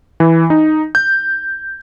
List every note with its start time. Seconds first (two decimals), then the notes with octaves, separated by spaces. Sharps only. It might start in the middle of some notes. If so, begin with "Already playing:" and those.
0.20 E3
0.50 D#4
0.95 G6